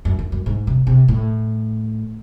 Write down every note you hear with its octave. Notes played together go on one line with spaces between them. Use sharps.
F#2
F#2
F#2
G#2
C3
C3
A2